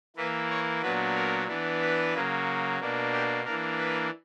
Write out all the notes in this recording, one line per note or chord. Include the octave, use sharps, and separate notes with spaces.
E3 A#3 E4 B4
C#5
A#2 F#3 B3 D4 B4
A#4
E3 B3 D4
B4
C#3 F#3 A#3
B2 A#3 D4
G4
E3 A#3 D4 A#4
B4